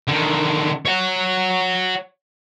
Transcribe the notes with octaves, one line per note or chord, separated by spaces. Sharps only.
D3 D#3
C#5 F#5